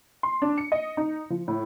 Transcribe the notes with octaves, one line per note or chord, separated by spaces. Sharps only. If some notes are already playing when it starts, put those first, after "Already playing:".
C6
D4
C#7
D#5
D#4
F3
A2